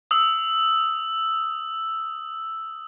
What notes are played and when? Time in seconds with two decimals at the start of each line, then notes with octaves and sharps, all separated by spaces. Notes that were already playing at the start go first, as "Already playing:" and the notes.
0.11 D#6 E6